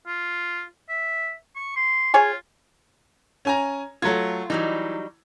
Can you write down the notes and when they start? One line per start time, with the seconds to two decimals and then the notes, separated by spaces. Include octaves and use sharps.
0.07 F4
0.89 E5
1.56 C#6
1.76 C6
2.14 F4 G#4 C#5 G#5
3.45 C#4 G#5 A#5
4.02 F#3 A3 F4 G#6
4.50 E3 F#3 G3 D#4